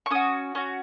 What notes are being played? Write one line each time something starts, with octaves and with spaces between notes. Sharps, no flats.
C#6
C#4 F#4 D#6
C#4 F#4